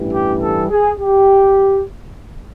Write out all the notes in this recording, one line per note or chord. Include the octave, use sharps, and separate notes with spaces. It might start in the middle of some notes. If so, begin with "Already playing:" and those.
Already playing: A1 G2 E3 G3
G4
A4
G#4
G4